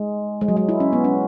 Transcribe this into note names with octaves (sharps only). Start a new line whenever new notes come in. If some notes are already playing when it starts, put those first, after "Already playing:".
Already playing: G#3
G#3
F#3
G#3
E4
C#4
B3
C#4